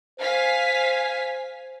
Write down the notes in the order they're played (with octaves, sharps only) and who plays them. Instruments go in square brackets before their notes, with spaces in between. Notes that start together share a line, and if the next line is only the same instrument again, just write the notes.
[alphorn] C5 [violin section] F5 G#5 B6